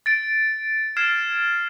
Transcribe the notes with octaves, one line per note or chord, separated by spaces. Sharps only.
A6 D7
F6 G#6 C7 E7